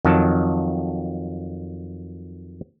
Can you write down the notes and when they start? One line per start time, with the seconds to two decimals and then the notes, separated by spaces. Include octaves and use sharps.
0.05 F2 D#3 F#3 A5